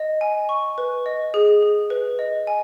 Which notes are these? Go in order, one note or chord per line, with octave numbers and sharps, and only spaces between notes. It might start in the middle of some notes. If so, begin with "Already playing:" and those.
Already playing: D#5
G#5
C#6
B4
D#5
G#4
G#4
B4
D#5
G#5